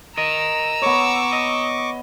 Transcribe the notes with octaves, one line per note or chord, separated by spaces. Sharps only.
A#4 D#5 A#5 E6
B3 C#5 C#6 D6
D#5